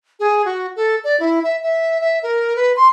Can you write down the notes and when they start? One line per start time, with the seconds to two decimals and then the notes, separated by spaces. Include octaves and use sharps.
0.20 G#4
0.45 F#4
0.76 A4
1.04 D5
1.20 E4
1.44 E5
1.63 E5
2.01 E5
2.23 A#4
2.56 B4
2.77 C6